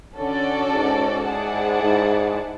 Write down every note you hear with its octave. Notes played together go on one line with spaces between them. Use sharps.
D3 C#4 F#4 A4 D5
G#2
E4 G#4 D5 F#5 A5
G#2